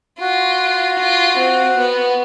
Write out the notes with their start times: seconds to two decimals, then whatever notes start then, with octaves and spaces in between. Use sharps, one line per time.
0.20 F4 F#4
0.99 F4
1.38 C4
1.77 B3